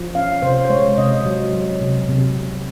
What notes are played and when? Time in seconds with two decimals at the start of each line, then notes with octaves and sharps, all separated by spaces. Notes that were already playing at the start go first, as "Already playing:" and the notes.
Already playing: F3
0.15 C#4 F5
0.42 C3 C5
0.65 C5
0.70 G#3 C#5
0.97 C3 D#5
1.25 F#3
1.53 F#3
1.81 C3
2.08 C3
2.36 C3